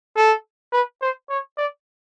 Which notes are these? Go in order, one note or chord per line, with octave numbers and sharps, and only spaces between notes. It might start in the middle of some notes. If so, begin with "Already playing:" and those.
A4
B4
C5
C#5
D5